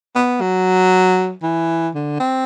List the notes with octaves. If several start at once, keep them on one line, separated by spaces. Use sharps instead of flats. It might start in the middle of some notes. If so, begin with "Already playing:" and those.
B3
F#3
E3
D3
C4